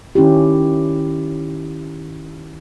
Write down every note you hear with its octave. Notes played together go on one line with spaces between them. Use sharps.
D#3 C#4 E4 G4